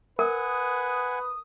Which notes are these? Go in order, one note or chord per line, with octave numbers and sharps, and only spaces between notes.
A#4 B4 F#5 G#5 D#6